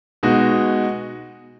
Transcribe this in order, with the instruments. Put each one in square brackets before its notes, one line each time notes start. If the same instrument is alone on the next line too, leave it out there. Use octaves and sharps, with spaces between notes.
[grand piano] B2 G#3 D#4 F#4